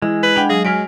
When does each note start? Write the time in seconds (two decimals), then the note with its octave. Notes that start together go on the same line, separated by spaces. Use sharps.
0.02 E3 G#3 E4
0.23 B4
0.36 D4 F#5 G5 B5
0.49 F#3 G#4 F5
0.65 F#3 G#5 F6 B6 D7